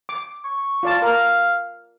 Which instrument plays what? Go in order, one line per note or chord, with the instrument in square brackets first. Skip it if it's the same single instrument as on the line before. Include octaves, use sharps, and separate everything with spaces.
[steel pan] D6
[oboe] C#6
[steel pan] F4 D5 A5
[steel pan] A#4 A#5 [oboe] F5